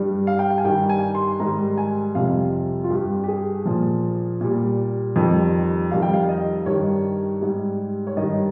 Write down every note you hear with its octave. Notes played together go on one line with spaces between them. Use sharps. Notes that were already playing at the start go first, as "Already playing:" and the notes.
Already playing: G2 G3
F5
G5
F5
G#5
G2 D#3 G3 G5
G#5
C6
G#2 D#3 G3 A#5
G#5
F2 C3 G3 F5
F4
G2 G3 G4
G4
G#4
A#2 F3
A#2 G3
F2 D#3 G3
F2 D#3 G3 F5
G5
F5
D#5
G2 D#3 G3 C#5
G#2 G3
C#5
G2 D#3 G3 D#5